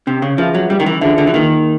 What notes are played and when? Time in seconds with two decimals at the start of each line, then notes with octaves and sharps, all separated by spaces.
0.07 C3 C#4
0.22 C#3
0.38 F3 F4 G#4 B4 E5
0.54 F#3
0.70 G3 C#4
0.80 D#3
0.86 E3
1.01 D3 F4 G#4 B4 E5
1.18 D3
1.27 E3
1.34 D#3 A#3